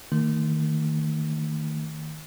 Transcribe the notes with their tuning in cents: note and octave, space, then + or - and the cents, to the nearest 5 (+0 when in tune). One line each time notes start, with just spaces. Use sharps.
D#3 +0 A3 +45